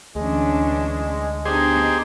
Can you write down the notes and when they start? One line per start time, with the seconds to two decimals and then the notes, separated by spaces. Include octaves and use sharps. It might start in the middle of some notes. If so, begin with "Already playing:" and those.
0.15 D2 E3 G#3 C#4 D4
1.45 B3 D4 D#4 G4 G#4 C5